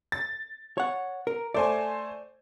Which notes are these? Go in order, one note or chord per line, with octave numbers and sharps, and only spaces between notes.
A6
C#5 F#5
A#4
A3 C5 D5 G#5